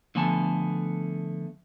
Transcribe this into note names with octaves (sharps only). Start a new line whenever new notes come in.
D3 F3 A3 B3 G#5 A5